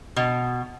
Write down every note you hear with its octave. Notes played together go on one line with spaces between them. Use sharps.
B2